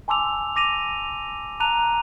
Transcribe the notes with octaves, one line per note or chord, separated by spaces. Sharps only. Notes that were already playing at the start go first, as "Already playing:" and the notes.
G#5 A5 C6 D6 E6 F7
D6 A#6 D#7 F7
A5 A#5 F#6 D#7 F7